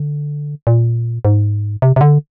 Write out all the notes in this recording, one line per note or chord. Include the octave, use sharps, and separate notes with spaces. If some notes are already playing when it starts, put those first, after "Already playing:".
Already playing: D3
A#2
G#2
C3
C3
D3